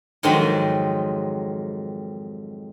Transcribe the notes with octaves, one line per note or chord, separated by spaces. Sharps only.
F2 G#2 D#3 F#3 C4 D#4